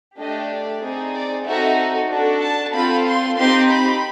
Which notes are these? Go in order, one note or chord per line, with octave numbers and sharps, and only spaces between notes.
A3 D4 G4 D#5
D5
C4 D#4 G#4
D5
C4 D#4 F#4 A4 E5
D4 F#4 A4
A5
C4 F4 A4 B5
C6
C4 D#4 G4 C6
B5